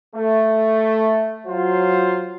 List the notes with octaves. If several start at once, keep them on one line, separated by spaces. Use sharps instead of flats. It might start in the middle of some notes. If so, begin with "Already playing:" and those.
A3
F#3 F4 C5